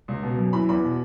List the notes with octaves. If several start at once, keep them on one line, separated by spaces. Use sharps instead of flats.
C#2
B2
F#2
E3 B5
E2 B5
B2